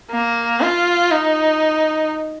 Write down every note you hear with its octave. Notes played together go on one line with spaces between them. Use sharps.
A#3
F4
D#4